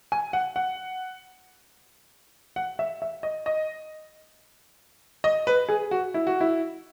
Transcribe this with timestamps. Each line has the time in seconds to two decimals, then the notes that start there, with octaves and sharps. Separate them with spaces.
0.12 G#5
0.33 F#5
0.56 F#5
2.56 F#5
2.79 E5
3.02 E5
3.23 D#5
3.46 D#5
5.24 D#5
5.47 B4
5.69 G#4
5.91 F#4
6.14 E4
6.27 F#4
6.41 E4